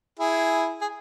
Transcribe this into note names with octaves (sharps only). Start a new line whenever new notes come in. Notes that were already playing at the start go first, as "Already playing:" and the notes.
E4 G#4
G#4